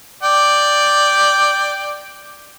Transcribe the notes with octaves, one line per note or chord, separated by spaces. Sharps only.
D5 G5